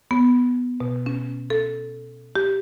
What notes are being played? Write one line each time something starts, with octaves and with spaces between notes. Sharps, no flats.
B3
B2
C#4
A4
G4